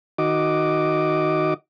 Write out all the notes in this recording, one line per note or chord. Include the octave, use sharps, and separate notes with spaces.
D#3 F#4 D#5 D6